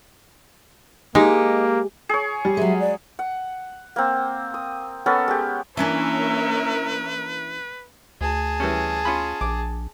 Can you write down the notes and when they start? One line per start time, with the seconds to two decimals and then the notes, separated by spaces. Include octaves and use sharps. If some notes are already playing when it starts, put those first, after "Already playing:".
1.15 G#3 A#3 D#4 G4
2.09 G#4 C#5
2.45 G3
2.57 F#3 G#3 E5
2.80 D5
3.19 F#5
3.96 A#3 C4
4.54 D#6
5.06 B3 C#4 A4 A#4
5.28 G#3 G4
5.77 E3 A#3 C#4 D4 A#4 B4 C#5 E5
8.21 D2 G#4 A5
8.60 E3 G3 C#4
9.05 C#4 F4 B5
9.41 A#1 D6